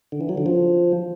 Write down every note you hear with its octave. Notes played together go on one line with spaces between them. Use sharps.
D3
E3
F#3
D3
F3